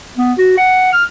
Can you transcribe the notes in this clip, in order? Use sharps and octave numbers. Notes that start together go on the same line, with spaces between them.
B3
F#4
F#5
F6